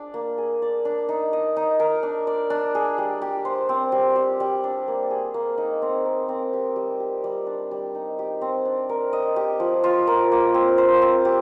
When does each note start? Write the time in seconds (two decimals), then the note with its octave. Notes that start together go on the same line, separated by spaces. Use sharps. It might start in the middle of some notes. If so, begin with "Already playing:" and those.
Already playing: D4 G#4 D5
0.14 A#3
0.38 G#4
0.62 D5
0.85 D4
1.09 D#4
1.33 D#5
1.56 D#4
1.80 A#4
2.03 D4
2.27 D5
2.50 D4
2.75 G#4
2.98 G3
3.22 G4
3.45 C5
3.69 C4
3.92 G3
4.16 G4
4.40 G3
4.64 D4
4.88 A#3
5.10 G#4
5.34 A#3
5.58 D#4
5.82 C4
6.05 A#4
6.29 C4
6.53 G4
6.76 G3
7.00 G4
7.24 G3
7.47 D4
7.71 G3
7.95 D#4
8.19 G4
8.41 C4
8.65 D4
8.89 A#4
9.13 D#5
9.36 G4
9.60 F3
9.84 F4
10.07 A#4
10.32 A#3
10.54 C4
10.78 C5
11.02 C4
11.25 G4